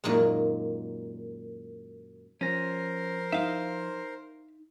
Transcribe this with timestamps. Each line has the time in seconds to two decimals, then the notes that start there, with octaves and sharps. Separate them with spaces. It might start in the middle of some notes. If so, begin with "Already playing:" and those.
0.04 F#2 A#2 D#3 G#3
2.41 F3 C#4 A#4 C5 A#6
3.32 D#4 E5 F5